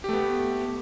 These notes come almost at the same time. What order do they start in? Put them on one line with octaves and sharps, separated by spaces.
G4 A3 B3